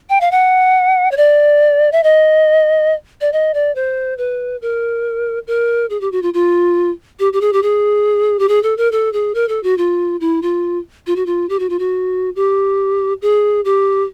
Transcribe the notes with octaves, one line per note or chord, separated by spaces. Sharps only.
G5
F5
F#5
C#5
D5
E5
D#5
D5
D#5
D5
C5
B4
A#4
A#4
G#4
G4
F#4
F4
F4
G4
G4
G#4
G4
G#4
G4
G#4
A4
A#4
A4
G#4
A#4
A4
F#4
F4
E4
F4
F4
F#4
F4
G4
F#4
F4
F#4
G4
G#4
G4